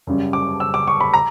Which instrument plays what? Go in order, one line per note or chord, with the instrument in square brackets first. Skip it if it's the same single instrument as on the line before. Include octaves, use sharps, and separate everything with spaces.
[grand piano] F#2 C#3 G3
D6
E6
D6
C#6
B5
A#5